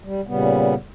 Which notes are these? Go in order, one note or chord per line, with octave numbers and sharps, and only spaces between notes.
G3
A#2 C#3 G3 B3